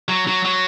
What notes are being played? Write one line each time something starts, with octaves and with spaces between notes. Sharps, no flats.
F#3
F#3
F#3